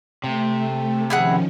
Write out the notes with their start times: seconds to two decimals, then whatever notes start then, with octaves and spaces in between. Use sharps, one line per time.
0.24 C3 A3
1.10 D#3 F3 C#4 E4 G#4 F#5